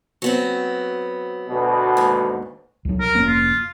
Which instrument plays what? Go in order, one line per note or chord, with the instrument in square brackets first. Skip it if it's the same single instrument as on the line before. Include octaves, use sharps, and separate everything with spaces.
[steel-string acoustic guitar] F#3 B3 C4
[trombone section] D2 B2
[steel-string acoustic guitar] D#2 G#2
[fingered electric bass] C2 F#3
[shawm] A#4
[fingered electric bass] F1 A#3 C#4
[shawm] F4